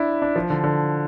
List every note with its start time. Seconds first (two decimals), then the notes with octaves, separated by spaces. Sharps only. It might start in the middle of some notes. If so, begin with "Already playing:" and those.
Already playing: D4 E4
0.22 D4
0.36 F3
0.50 D3
0.64 D3